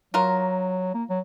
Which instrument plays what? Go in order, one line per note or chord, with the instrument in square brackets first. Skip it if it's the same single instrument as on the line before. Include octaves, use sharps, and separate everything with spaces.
[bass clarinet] F#3 [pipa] F4 F#4 A#4
[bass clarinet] A#3
F#3